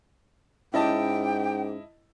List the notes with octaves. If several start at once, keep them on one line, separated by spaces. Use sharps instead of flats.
G#2 C#4 E4 D#5 G5 A5